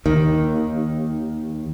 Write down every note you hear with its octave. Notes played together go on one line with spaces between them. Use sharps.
D#2 D#3